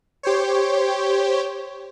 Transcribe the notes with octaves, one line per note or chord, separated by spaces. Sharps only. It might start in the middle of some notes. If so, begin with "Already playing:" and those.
G4 C5 C#5